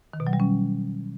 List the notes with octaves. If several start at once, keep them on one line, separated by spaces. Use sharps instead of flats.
D#3
B2
F#3
G3
C#4